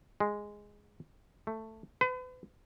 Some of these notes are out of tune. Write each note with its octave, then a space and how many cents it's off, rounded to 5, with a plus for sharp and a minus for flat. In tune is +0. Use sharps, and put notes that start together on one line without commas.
G#3 -5
A3 +10
B4 +40